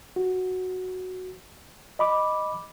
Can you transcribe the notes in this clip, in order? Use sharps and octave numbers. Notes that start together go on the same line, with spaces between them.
F#4
D#5 B5 D6